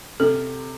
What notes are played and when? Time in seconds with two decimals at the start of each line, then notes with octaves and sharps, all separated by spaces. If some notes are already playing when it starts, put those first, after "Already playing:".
0.20 C3 A4